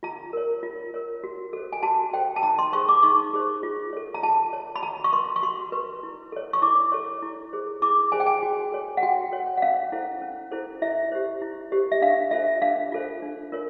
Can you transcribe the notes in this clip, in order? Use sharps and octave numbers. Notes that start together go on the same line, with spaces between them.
F4 A#5
A#4 C#5
F4
A#4 C#5
F#4
A4 C5
G#5
F#4 A5
A4 C5 G5
A5
D#4 A#5
C6
G#4 C5 C#6
D6
D#4 C#6
G#4 C5
F4
A4 C#5
A#5
F4 A5
A4 C#5
B5
F#4 A#5
C#6
B4 C6
C#6
F#4 C6
B4
E4
A4 C#5
C#6
E4 D6
A4 C#5
E4
G#4 C5
E4 D6
G#4 C5 G#5
G5
G#5
F#4
A4 C#5
F#5
F#4 G5
A4 C#5
F#5
C#4 F5
E4 A4 C5
C#4
E4 A4 C5
E4 E5
G4 C5
E4
G4 C5
E5
D4 F5
F4 A4 C5 E5
D4 F5
F4 A4 C5
D4
F4 A#4 C#5